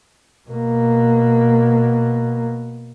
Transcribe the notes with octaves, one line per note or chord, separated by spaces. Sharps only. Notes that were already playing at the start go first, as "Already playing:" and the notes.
B2 A#3